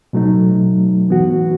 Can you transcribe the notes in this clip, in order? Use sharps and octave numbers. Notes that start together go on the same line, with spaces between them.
B2 F#3 A3 D#4
E3 B3 F#4